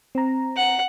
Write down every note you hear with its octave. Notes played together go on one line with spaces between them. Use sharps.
C4 A#5
F#5